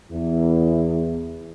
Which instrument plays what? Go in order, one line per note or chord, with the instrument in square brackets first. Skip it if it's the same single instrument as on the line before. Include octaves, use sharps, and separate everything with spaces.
[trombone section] E2 E4